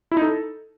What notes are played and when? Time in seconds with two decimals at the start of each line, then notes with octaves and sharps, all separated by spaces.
0.11 E4
0.17 D#4
0.22 A4